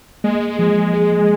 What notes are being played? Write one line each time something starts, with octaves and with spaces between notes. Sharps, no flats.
G#3 A#3
F3
G#4